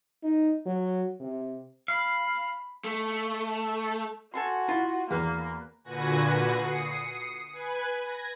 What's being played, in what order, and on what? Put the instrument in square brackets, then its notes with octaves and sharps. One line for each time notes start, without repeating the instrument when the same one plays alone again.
[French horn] D#4
F#3
C3
[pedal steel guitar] F5 [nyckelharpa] B5
[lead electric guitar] A3
[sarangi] F#4 [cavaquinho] A4 G#5 C6
[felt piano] E4 [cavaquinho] F4
[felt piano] E2 [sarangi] A#3 [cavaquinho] B4 F5
[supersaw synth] A#2 D3 F#4 B4 G#5 A#6
D#6 C7 C#7
B4 G#5
G#6 A#6